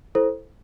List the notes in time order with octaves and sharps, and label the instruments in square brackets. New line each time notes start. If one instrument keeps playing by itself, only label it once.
[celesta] E4 A4 C5